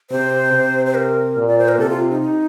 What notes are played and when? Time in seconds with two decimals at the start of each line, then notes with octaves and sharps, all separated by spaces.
0.11 C3 C5
0.53 C3
0.86 C5
0.95 A#4
1.37 A#2
1.48 D5
1.58 C5
1.68 A#4
1.79 C3 A4
1.90 F4
2.11 D#4
2.21 D#4